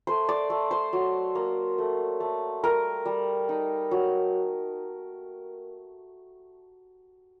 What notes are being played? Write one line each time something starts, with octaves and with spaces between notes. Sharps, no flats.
A3 C5
D5
A3
C5
F#3
A#3
A3
A3
G3 A#4
G3
D#4
F#3